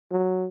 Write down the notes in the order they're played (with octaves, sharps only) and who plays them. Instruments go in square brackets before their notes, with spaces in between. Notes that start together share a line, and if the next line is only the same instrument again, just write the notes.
[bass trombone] F#3